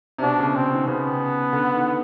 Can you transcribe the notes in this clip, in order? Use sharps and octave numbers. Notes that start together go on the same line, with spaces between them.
C3
B2 D4
C#3
C4
D#3
C#3 B3
D3
D#3